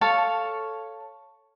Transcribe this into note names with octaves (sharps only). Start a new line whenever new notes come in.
A4 C#5 F5 A5